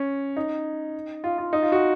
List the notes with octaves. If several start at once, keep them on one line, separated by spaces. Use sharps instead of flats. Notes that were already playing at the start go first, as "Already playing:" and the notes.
Already playing: C#4
D#4
F4
F4
D#4
F4
F#4